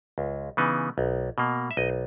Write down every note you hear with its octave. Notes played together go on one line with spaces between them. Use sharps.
C#2
C#3 E3 B3 D#4
B1
B2 A#3
E5
B1 D#5